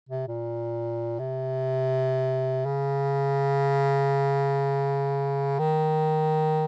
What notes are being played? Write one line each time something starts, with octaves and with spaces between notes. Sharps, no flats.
C3
A#2
C3
C#3
D#3